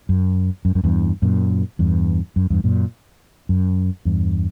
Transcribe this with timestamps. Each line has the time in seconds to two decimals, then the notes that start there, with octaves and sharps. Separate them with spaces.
0.09 F#2
0.65 F#2
0.75 F#2
0.84 E2 G2
1.22 F#2 A#2
1.79 E2 G2
2.36 F#2
2.50 E2 G2
2.64 F#2 A#2
3.49 F#2
4.05 E2 G2